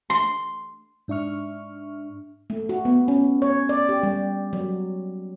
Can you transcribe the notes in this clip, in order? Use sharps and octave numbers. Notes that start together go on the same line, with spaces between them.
C6
G#2 D4 E5 C#6 F6
A3
F#4
B3
C#4
C#5
D5
G4
G3
F#3